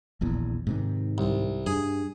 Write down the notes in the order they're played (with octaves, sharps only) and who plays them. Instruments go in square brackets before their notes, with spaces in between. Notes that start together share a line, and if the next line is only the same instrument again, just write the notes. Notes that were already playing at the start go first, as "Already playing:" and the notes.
[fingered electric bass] D#1 A#1 E2
G#2 C3 D#3
[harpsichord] C2
[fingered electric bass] G2 [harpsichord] G#4